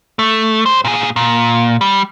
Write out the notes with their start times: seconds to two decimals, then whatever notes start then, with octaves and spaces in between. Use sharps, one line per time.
0.19 A3
0.66 G3 C5
0.85 A#2 G#4
1.16 A#2
1.81 G3